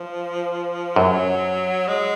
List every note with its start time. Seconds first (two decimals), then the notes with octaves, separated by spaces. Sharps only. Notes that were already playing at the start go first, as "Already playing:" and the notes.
Already playing: F3
0.96 F#2 F#3
1.88 G#3